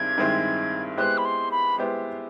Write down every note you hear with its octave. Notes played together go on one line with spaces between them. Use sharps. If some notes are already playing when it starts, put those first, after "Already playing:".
Already playing: G2 D#3 G#3 C4 E4 G#6
G2 D#3 G#3 C4 E4
G#3 B3 E4 G4 C5 F#6
B5
C6
B5
G#3 B3 E4 G4 C5